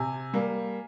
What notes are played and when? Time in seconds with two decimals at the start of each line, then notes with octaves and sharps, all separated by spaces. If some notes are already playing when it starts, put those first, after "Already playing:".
Already playing: C3 G#5
0.34 G3 A#3